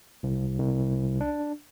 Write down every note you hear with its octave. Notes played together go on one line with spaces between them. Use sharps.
C2
C2
D4